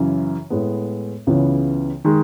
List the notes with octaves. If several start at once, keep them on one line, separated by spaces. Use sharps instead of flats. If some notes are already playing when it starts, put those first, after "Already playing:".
Already playing: F#2 C#3 E3
A2 G#3 B3
C#2 C#3 E3 B3
D#3 G#3